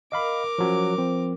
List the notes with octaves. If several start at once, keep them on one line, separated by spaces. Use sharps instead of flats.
A#4 D#5 F5 B5 D6
F3 F#3 C#4
F3 C4